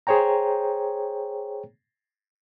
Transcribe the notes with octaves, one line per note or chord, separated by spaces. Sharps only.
G#4 C5 C#5 G5 A#5